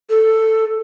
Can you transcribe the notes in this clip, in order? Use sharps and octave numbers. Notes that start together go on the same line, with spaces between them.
A4